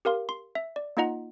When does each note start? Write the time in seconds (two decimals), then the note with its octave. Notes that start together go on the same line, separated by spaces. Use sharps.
0.05 G4 A#4 F5 C6
0.29 C6
0.55 E5
0.76 D5
0.97 A#3 D#4 F4 D#5 F#5 A#5